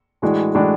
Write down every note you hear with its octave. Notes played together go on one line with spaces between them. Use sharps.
A2 E3 G#3 D4 F#4
A2 E3 G#3 D4 F#4